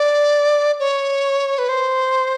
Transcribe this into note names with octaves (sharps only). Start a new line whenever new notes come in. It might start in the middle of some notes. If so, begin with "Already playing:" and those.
Already playing: D5
C#5
B4
C5